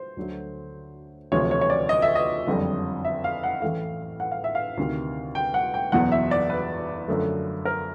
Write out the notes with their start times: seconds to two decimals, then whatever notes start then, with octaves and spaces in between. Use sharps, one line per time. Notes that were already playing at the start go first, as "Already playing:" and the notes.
Already playing: C5
0.17 D2 D3 F#3 A3
1.32 E1 D2 C3 F3 A3 C#5
1.51 C#5
1.61 C#5
1.70 D5
1.89 D#5
2.02 E5
2.15 D#5
2.47 F#1 F2 D3 G3
3.05 E5
3.24 F5
3.43 F#5
3.62 A1 A2 E3 A3 F5
4.20 F#5
4.31 F5
4.44 E5
4.55 F5
4.77 D2 C3 D#3
5.35 G5
5.54 F#5
5.74 G5
5.92 F#1 E2 B2 F#5
6.12 E5
6.31 D5
6.50 B4
7.08 F#2 D3 F3 A3
7.65 A#4